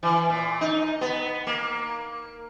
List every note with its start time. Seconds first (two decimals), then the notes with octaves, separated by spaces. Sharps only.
0.03 E3
0.30 A#2
0.61 D#4
1.01 B3
1.47 A#3